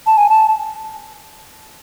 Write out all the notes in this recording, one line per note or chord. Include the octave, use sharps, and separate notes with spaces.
A5
G#5
A5